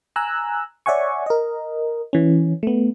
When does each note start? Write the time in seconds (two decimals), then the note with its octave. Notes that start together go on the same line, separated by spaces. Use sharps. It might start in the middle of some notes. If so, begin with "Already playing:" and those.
0.16 G#5 A#5 E6 F#6
0.86 C#5 D5 E5 F#5 G#5 C#6
1.26 A#4 D#5
2.13 E3 C#4
2.63 A3 B3